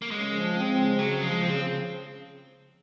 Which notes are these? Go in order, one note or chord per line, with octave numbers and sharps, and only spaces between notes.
A#3
C#3 G#3
F3
C4
C#3
C#3 F#3
F3 G#3
C#3 C4